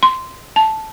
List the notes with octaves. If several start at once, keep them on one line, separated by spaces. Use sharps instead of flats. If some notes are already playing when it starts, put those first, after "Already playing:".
C6
A5